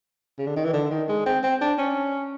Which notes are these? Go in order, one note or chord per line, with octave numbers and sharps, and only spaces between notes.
C#3
D3
D#3
E3
D3
D#3
G#3
C4
C4
D4
C#4